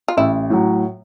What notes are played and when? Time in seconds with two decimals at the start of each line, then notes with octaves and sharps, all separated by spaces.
0.08 F4
0.17 A1 E4
0.50 A2 F#3